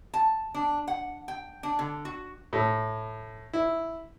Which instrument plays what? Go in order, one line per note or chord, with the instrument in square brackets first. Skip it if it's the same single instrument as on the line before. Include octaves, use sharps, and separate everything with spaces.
[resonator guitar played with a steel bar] A5
D4
F#5
G5
D4
D3
F#4
[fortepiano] A2
E4